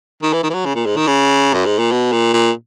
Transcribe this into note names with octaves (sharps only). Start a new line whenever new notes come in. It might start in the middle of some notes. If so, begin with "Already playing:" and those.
D#3
E3
D#3
E3
F#3
C#3
A#2
G#2
D#3
C#3
F#2
G#2
A#2
B2
A#2
A#2